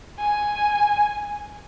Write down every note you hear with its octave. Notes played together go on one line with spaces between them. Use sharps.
G#5